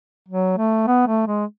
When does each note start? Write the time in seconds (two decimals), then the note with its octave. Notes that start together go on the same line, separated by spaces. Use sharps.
0.28 F#3
0.58 A3
0.87 B3
1.07 A3
1.27 G#3